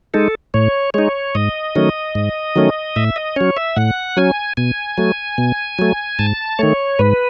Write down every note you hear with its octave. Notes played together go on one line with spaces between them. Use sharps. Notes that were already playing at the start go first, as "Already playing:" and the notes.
G#3 D#4 A4
A2 C#5
G#3 D#4 C#5
G#2 D#5
D#3 F#3 A3 C#4
G#2
D#3 F#3 A3 C#4
A2 E5
D#5
F#3 C#4 C#5
E5
A2 F#5
F#3 C#4 G#5
B2 G#5
F#3 A3
B2
F#3 A3
G#2 A5
D#3 A3 C#5
G#2 B4